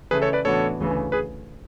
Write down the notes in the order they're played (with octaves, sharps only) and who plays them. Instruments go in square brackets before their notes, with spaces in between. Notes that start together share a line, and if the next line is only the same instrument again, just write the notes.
[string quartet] C#3 E3 A3 [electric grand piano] G#4 B4
[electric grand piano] A4 C#5
B4 D5
[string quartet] A2 E3 B3 D4 F#4 [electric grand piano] A4 C#5
[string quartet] D2 C#3 E3
[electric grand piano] G#4 B4